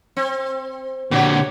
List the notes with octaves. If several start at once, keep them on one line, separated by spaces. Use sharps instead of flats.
C4
A#2 D3 F#4 G4 C#5